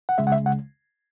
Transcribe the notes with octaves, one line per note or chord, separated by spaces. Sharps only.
F#5
C#2 C#3 G#3 E5
F#5
E5
F#5